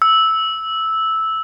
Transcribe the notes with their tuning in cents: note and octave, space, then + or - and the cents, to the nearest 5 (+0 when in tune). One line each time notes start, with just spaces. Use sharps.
E6 -10